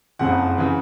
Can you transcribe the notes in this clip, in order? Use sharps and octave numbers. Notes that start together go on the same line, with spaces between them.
F#1 F2 C#3 F3 F#5
C#3 E3